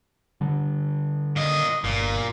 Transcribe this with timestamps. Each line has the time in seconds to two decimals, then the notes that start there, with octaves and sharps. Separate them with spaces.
0.41 D3 G3
1.36 A#2 D#5
1.84 G1 A#2